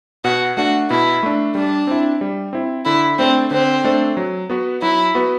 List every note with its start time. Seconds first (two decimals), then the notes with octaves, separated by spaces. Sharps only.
0.24 B2 F#4
0.57 A3 D4 F#4
0.90 B2 E4
1.23 A3 D4
1.55 G3 D4
1.87 C4 E4
2.21 G3
2.53 C4 E4
2.85 D3 E4
3.19 A3 C4 D4 A4 C5
3.51 D3 C4
3.84 A3 D4 A4 C5
4.17 F#3
4.50 B3 F#4 B4
4.81 F#3 E4
5.15 B3 F#4 B4